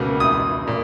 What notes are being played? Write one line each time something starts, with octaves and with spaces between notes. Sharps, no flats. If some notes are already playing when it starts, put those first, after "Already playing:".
Already playing: C#2 B2 A#3
D#6
A#2